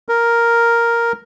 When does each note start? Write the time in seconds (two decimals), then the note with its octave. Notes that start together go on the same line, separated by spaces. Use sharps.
0.08 A#4